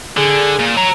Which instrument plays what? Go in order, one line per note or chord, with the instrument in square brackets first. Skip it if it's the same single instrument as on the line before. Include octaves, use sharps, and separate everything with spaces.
[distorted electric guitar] D3 [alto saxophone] G#4
[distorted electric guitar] A#2
C#5 A#5